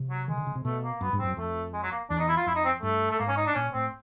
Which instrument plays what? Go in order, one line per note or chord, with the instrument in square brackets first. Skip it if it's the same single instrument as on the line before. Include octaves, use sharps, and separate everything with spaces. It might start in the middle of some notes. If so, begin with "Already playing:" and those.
Already playing: [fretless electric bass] C3
[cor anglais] F#3
[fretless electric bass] D#3 [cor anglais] G#3
[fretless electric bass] D3
C#3
C3
[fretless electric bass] B2 [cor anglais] A3
[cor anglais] A#3
[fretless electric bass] F#2 [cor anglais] B3
[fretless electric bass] G2
[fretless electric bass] F#2 [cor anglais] C4
[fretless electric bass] F2 [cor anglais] A3
[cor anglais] G#3
F#3
A#3
[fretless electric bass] E2 [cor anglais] D4
[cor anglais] D#4
E4
F4
[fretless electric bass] F2 [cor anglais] E4
[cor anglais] D#4
C4
[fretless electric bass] G2 [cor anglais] A3
[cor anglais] A3
[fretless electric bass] G#2 [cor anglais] A#3
[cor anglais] C#4
D#4
D4
[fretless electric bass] A#2 [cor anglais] C#4
[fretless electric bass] A2 [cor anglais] C4